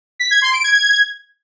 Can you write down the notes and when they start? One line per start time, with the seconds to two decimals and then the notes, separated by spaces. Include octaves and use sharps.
0.19 B6
0.31 G#6
0.42 C6
0.53 D7
0.64 G#6